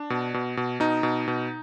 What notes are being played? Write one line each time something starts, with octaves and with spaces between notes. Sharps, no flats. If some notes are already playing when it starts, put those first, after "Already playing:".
Already playing: D4
B2
B2
B2
B2 D#4
B2
B2